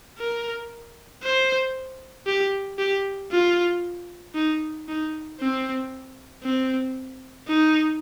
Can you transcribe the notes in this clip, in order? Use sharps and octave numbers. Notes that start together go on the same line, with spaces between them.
A#4
C5
G4
G4
F4
D#4
D#4
C4
C4
D#4